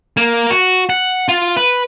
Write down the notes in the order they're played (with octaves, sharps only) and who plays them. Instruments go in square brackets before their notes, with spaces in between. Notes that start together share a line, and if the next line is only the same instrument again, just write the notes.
[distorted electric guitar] A#3
F#4
F#5
F4
B4